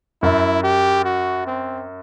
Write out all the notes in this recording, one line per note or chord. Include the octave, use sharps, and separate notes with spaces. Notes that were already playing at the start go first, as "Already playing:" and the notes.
F#2 E4
G4
F#4
C4